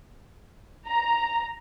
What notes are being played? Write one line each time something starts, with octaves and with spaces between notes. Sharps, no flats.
A#5